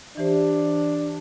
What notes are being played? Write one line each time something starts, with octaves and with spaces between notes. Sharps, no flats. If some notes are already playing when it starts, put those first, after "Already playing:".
E3 D4 G4 C5